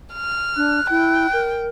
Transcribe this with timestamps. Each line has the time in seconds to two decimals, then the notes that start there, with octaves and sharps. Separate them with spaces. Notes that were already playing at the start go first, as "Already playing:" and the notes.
0.13 F6
0.57 D4 F#6
0.90 E4 G5
1.33 A#4